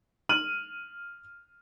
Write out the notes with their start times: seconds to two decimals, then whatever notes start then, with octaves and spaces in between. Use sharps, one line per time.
0.29 F6 D#7 F#7